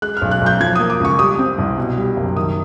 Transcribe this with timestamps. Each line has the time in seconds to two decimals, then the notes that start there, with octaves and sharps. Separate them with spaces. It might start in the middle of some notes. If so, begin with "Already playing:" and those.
0.02 G#3 F#6
0.17 B1 F6
0.31 F#6
0.41 B1
0.46 G6
0.60 F3 G#6
0.75 A#3 D#6
0.90 D6
1.00 C#2 C#6
1.19 G3 D#6
1.39 C4
1.58 C2
1.77 B2
1.97 G3
2.17 F#1
2.36 D#3 D#6